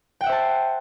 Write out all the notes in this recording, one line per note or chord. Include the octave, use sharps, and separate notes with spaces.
C5 E5 F#5 G5 A5